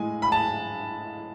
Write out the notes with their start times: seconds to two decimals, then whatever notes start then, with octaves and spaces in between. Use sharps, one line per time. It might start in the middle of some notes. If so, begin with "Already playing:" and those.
Already playing: A2 G#3 G#5
0.22 B5
0.32 A5